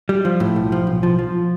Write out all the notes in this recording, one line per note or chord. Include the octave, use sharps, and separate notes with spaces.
G3
F3
A2
B1
F3
B1
F3
F3